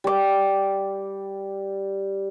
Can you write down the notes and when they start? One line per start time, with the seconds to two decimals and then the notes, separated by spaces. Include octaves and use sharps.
0.04 G3 D6